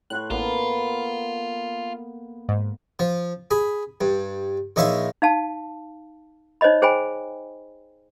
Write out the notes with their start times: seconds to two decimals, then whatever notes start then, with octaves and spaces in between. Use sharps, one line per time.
0.10 A2 C6 C#6 F#6
0.30 A1 A#3 B3 F4
2.49 G#2
2.99 F3
3.51 G#4 B5
4.01 G2
4.76 A#1 D#4 C#5 E5 F5 C6
5.22 D#4 F5 A5
6.61 D#4 C5 C#5 D#5 B5
6.82 G#4 C5 G5 G#5 B5